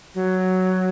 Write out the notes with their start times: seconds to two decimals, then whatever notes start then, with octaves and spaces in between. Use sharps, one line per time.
0.15 F#3